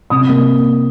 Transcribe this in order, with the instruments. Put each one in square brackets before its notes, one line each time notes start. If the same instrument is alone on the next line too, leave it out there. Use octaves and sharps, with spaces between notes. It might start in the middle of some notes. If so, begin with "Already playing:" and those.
[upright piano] C3 D#6
A#3